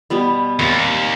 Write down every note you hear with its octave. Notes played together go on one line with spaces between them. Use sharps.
B2 G3 B3
D#2 C4 D6